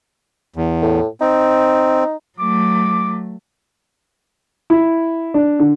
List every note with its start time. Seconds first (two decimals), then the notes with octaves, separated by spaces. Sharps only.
0.56 E2
0.82 A2
1.21 C4 D#4
2.39 F#3 A3 D6
4.70 E4
5.34 D4
5.59 D3